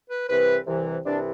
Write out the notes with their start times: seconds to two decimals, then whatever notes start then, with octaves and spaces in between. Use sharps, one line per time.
0.09 B4
0.28 C2 C3 E3 B4
0.67 C2 C3 E3
1.05 C2 C3 E3 D4